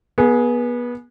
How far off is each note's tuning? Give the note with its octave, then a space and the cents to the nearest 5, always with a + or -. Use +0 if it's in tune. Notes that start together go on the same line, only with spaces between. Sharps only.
B3 -25 G#4 +10